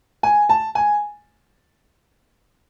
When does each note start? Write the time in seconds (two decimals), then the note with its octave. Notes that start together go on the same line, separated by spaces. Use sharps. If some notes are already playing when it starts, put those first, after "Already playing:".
0.23 G#5
0.49 A5
0.75 G#5